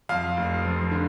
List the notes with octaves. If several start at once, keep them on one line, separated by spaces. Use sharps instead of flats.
F2 F5
F1
F3
D3